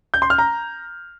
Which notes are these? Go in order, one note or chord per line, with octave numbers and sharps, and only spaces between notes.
G6
C6
F6
A#5